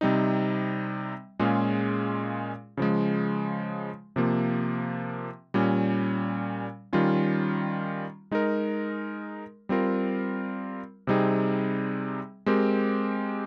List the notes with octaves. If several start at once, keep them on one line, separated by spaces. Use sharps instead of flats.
C3 G3 C4 D#4
A#2 G#3 C#4 F4 G#4
C#3 F3 G#3
C3 F3 A#3
A#2 G3 C#4
D#3 G3 C#4 F4
G#3 D#4 A#4
G3 C4 F4 A#4
C3 G3 C4 D#4 G#4
G#3 C4 G4 A#4